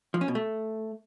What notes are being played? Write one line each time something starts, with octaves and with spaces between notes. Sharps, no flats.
F3
C#4
B2
A3